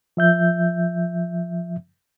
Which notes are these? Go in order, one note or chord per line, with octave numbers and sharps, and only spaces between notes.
F3 E5 G6